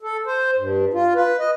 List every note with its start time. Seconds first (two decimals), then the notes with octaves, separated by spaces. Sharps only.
0.02 A4
0.26 C5
0.57 G2
0.93 F4
1.15 B4
1.39 D#5